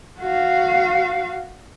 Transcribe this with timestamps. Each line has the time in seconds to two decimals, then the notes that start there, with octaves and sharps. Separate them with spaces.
0.19 F#4 F5